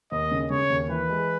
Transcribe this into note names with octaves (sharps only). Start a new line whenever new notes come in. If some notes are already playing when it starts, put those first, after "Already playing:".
D#2 D#5
C#3
C#3 C#5
D#2
E3 B4
G#3